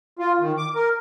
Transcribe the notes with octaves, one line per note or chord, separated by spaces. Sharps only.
F4
D#3
D6
A#4